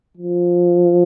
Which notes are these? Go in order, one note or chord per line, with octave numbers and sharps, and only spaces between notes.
F3